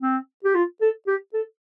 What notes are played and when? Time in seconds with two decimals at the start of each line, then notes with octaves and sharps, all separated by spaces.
0.01 C4
0.45 G4
0.55 F4
0.81 A4
1.07 G4
1.34 A4